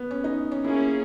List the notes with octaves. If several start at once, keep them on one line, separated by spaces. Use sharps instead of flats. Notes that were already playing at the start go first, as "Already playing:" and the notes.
Already playing: B3
C#4
D#4
C#4
A#3 C#4 E4 G#4